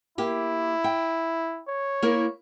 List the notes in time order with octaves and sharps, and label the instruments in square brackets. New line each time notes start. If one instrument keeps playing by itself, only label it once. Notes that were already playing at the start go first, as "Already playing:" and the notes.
[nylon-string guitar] A#3 G4 [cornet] E4
[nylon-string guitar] G5
[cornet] C#5
[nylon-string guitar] A#3 E4 A#4